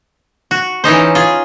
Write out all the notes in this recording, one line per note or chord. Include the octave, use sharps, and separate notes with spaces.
F#4
E3 C#4 D#4 C5
F4 G#4